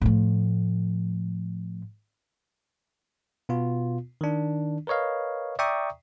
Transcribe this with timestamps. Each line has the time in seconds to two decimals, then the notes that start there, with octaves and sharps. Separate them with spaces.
0.02 A2 F3
3.49 B2 B3 F4
4.21 D#3 D4
4.87 A#4 B4 C#5 D#5 F5
5.59 D5 E5 G5 A#5 C#6 D#6